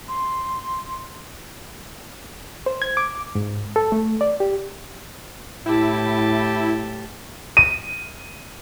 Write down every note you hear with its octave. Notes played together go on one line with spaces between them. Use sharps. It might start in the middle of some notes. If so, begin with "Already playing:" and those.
C6
C5
G#6
D6
G#2
A4
A3
D5
G4
A2 E4 G4 A5
D#7